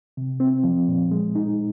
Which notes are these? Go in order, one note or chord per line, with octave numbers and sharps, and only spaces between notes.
C3
C4
F3
A#2
G#3
D#4